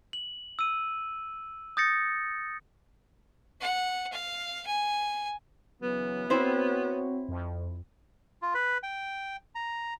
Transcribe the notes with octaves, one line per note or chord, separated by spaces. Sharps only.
F#7
E6 D#7
D#6 G6 A6 A#6 C#7
F#5
F5
G#5
C#3 E3 F#3 B3
C4 E4 F#4 C5 C#5
F2
F4
B4
G5
A#5